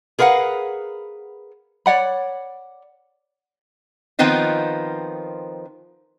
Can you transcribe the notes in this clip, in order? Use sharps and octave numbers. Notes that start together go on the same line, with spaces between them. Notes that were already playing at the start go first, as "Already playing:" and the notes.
G#4 A#4 B4 F5 F#5
C#5 D5 F#5 B5
D#3 F3 B3 C4 D#4 F4